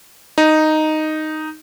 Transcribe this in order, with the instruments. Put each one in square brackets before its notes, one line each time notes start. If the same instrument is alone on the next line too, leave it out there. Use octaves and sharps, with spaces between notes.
[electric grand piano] D#4